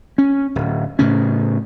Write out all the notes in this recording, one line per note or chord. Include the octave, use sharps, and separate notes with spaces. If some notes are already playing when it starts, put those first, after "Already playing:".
C#4
D1
A2 C#3 C#4